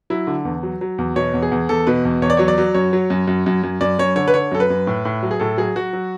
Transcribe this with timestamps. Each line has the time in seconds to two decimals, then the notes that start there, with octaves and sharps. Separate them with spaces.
0.10 F#3 E4
0.27 D3
0.45 E2
0.63 F#3
0.81 F#3
0.98 E2
1.16 B2 C#5
1.34 E2
1.42 G#4
1.52 E2
1.69 E2 A4
1.87 B2 B4
2.05 E2
2.22 E2 C#5
2.30 D5
2.37 F#3 C#5
2.48 D5
2.58 F#3
2.74 F#2 C#5
2.93 F#3
3.10 F#2
3.27 F#2
3.46 F#2
3.63 F#2
3.81 F#2 D5
3.99 F#2 C#5
4.16 D3 C#5
4.28 B4
4.34 D3 C#5
4.52 F#2 A4
4.60 B4
4.70 F#2
4.87 A2
5.05 A2
5.23 F#3
5.31 G#4
5.40 A2 A4
5.58 F#3 G#4
5.76 F#3 F#4
5.93 F#3